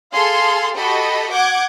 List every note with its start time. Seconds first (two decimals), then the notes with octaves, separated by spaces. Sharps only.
0.13 G#4 A4 F5 C6
0.76 F#4 G4 A4 D#5 B5
1.33 F#5 D6 G6 G#6